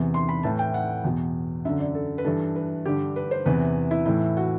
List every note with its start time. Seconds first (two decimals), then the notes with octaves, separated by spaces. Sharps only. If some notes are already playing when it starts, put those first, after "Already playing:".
Already playing: E2 C3 E3
0.14 C6
0.29 B5
0.43 A2 E3 A5
0.59 G5
0.74 F#5
1.04 E2 B2
1.65 F#2 E5
1.69 D3
1.80 D5
1.94 A4
2.18 B4
2.24 G2 E3 A4
2.56 B4
2.86 G2 D3 G4
3.16 B4
3.31 C5
3.46 E2 C3 E3 B4
3.91 E4
4.05 A2 E3 E4
4.37 F#4